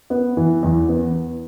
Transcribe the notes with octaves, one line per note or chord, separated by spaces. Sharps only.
B3
E3
E2
B3